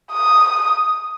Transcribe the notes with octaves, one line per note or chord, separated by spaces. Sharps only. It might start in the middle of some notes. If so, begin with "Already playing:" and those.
D#6